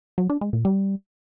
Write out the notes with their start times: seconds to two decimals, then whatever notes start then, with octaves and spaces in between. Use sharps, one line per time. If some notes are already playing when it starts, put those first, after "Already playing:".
0.18 F#3
0.30 D4
0.41 G#3
0.53 A#2
0.65 G3